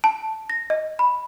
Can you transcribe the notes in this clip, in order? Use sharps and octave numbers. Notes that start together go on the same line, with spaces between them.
A5
A#6
D#5
B5